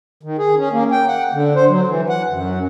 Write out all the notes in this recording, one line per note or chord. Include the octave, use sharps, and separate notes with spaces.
D#3
G#4
C#4
A#3
G5
F#5
D3
C5
F#3
E3
F#5
F#2